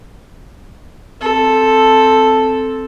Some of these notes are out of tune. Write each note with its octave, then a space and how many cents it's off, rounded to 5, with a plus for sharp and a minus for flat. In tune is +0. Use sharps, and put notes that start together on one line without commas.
C4 +0 A4 +0